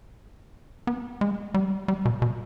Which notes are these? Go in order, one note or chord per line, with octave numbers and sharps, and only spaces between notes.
B3
G#3
G3
G3
B2
B2